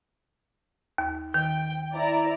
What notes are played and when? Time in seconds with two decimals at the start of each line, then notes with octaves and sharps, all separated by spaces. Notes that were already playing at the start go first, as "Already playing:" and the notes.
0.98 D#2
1.34 D#3 G5
1.94 E4 D5 A#5